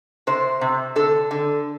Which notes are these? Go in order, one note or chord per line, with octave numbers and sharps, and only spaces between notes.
C3 C5
C3
D3 A4
D3